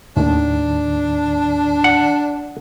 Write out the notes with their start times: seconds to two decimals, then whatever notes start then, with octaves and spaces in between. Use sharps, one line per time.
0.17 D#2 A2 D#3 D4
1.84 F#5